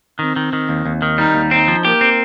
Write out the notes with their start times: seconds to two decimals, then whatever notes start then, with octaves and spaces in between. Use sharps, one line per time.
0.19 D#3 C4
0.36 D#3
0.53 D#3
0.69 D#2
0.86 D#2
1.02 D#3
1.18 G3 D#4
1.34 D#2
1.51 C4 D#4
1.68 F3
1.85 A#3 G4
2.01 C4